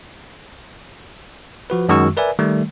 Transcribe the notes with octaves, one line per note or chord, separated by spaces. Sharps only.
F3 F#4 B4
F#2 D#3 G#3 F#4 C#6 E6
A#4 B4 D5 E5 G#5
D#3 G3 A3